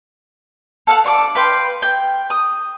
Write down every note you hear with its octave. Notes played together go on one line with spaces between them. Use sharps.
A4 F5 F#5
D4 C#6 D6
B4 F5 G5 C6
G5
D#6